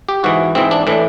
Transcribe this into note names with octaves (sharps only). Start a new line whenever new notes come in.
G4
G#2 E3 F#4
G#2 E3 C4
D4
A2 E3 D4